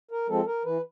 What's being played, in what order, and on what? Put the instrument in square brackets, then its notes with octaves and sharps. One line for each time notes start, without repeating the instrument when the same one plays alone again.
[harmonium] A#4
F3 G#3 C4 A4
A#4
E3 B4